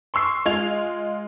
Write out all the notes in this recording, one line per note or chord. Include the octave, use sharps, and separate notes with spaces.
C6 C#6 E6 C7
G#3 F4 G#6 F7